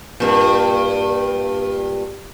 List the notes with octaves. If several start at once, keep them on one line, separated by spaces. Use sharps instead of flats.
G2 A#2